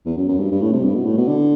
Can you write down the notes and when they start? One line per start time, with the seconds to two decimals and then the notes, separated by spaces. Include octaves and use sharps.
0.06 E2
0.17 F#2
0.28 F#2
0.39 G2
0.52 G2
0.62 A2
0.73 C3
0.84 G2
0.95 B2
1.06 A2
1.17 B2
1.28 D3